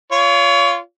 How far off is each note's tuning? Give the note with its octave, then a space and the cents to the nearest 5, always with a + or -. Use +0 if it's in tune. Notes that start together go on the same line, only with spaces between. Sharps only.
F4 -10 C#5 +30